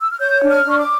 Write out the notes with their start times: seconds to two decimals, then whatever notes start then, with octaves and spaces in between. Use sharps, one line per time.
0.01 E6
0.11 F6
0.19 C#5 G6
0.42 D4
0.50 F6
0.65 D4 C#6
0.78 D6